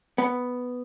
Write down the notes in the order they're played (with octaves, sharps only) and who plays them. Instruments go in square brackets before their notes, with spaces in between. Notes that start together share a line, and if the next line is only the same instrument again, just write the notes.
[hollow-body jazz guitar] B3